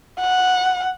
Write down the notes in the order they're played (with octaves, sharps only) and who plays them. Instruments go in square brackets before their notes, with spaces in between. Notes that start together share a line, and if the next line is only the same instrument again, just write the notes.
[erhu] F#5